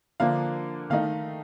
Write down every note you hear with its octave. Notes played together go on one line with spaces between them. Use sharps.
D3 F3 A#3 D4 F5
D#3 A3 D#4 F5